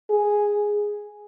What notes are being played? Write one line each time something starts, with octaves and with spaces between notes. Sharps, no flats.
G#4